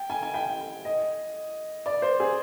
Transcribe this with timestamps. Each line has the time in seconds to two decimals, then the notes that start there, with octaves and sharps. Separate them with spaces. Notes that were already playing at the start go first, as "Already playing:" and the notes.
Already playing: G5
0.10 G#5
0.23 G#5
0.34 G5
0.85 D#5
1.86 D5
2.02 C5
2.20 G#4